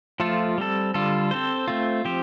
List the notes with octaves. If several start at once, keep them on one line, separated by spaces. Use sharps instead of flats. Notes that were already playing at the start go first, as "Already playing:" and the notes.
F3 A3 F4 A4
G3 C4 A4
D3 G3 F4 A4
C4 A4 C5
A3 C4 F4
F3 C4 G4 C5